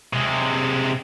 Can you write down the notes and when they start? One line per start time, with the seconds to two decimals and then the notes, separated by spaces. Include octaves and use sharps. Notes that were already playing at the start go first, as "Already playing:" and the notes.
0.13 C3 G#3